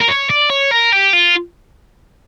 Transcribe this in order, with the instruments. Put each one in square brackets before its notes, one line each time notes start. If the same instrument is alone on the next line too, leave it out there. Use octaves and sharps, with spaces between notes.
[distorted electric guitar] A#4
C#5
D5
C#5
A#4
G4
F4